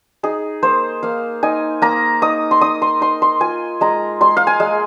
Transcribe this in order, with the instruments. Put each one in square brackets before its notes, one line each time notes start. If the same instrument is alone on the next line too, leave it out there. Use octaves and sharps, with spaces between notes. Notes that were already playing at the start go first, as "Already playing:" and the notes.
[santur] D#4 G#4
A#3 C5
A#3 F5
D#4 G#5
A#3 A#5
D#4 D#6
C6
D#4 D#6
C6
D#4 C6
C6
F4 G#5
G#3 A#5
G#3 C6
F5
G#5
G#3